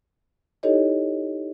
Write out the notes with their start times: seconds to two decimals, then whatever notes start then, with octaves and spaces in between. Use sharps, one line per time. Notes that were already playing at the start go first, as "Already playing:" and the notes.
0.63 D#4 E4 G4 A4 C#5 D#5